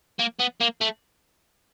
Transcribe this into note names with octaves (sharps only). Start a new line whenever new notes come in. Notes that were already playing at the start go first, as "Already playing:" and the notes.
A#3
B3
A#3
A3